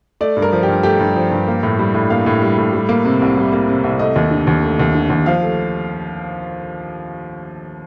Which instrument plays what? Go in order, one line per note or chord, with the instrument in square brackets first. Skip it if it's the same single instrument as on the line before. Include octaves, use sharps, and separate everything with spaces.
[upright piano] A3 D5
G2
A#4
F3
G4
G2
A3 G4
G2
F3
G2
A#3
A2
G3
A2
A#3 F5
A2
G3
A2
G3
A#3
C3
C2
G3
A#3
C3
C2
A3 D#5
D#2
D3
D#2
A3
D#2
D3
D#2
F3 F5
A3